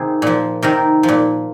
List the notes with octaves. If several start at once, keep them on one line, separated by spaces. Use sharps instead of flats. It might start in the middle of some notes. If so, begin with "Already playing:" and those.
Already playing: C3 D#3 G#4
A#2 F3
C3 D#3 A#4
F3
A#2